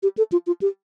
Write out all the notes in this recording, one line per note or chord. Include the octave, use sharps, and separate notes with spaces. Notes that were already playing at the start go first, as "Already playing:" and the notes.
G4
A4
F4
F4
G4